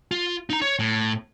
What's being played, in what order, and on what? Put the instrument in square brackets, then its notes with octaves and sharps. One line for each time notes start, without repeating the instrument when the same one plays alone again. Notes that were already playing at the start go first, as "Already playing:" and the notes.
[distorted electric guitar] F4
D#4 A#5
C#5
A2